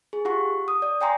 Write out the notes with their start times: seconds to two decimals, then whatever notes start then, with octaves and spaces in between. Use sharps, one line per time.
0.13 G#4
0.25 F4 G4 F#5 C#6
0.68 D#6
0.82 D5
1.01 D5 G5 G#5 A#5 C6